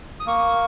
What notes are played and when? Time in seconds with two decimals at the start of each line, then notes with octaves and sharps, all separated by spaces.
0.20 D#6
0.27 A#3 C#6